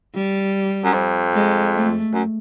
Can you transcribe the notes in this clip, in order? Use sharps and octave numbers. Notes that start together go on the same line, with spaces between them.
G3
F#2
F2
G#3
A3
F#2